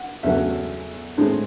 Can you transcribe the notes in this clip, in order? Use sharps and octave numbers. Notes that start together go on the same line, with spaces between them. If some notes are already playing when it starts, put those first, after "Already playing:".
Already playing: F#5
E2 C#3 F#3 A3 E5
A2 G#3 C4